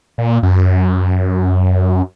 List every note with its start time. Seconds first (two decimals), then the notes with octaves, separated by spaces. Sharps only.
0.18 A#2
0.43 F#2